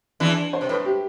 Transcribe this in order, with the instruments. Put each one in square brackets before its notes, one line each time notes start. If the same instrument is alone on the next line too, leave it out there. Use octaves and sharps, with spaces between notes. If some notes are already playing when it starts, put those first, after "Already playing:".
[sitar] E2 E3 [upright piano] D4
[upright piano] C5
[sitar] C3
[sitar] A2 [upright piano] B4
[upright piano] G4